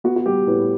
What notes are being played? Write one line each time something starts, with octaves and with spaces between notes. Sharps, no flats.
B3 F#4
F#4
G3 G4
A2 B4